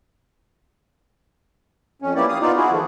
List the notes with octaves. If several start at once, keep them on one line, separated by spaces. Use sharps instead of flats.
F2 C#4
A#3 B3 E4 G4 D5
F5 D#6
B3 D#4 F4 D5
E4 F#4 G#4
D#3 F3 A3